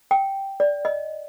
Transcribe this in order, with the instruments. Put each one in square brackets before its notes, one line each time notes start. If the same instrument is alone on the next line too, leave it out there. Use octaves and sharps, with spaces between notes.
[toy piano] G5
D5
D#5